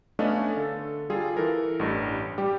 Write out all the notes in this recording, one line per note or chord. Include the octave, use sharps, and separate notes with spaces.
A3 B3 C#4 D4 D#5 F5
D3 A4
G3 F4 G#4 A4
E3 A4 A#4
A1 G2
G3 G4